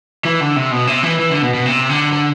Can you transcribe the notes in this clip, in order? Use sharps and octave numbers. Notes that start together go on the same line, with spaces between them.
E3
D3
C3
B2
C3
E3
E3
D3
B2
B2
C3
D3
D3